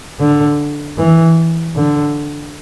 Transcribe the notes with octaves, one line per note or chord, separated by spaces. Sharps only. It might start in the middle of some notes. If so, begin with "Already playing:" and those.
D3
E3
D3